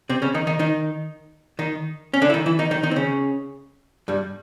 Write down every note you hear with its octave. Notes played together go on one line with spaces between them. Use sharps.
C3 C4
C#3 C#4
D#3 D#4
D#3 D#4
D#3 D#4
D#3 D#4
C#4
D3 D4
E4
D#3 D#4
E3 E4
D#3 D#4
D#3 D#4
D#3 D#4
C4
C#3 C#4
G2 G3